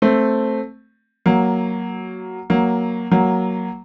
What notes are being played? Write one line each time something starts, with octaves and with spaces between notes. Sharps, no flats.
A3 C4
F#3 A#3
F#3 A#3
F#3 A#3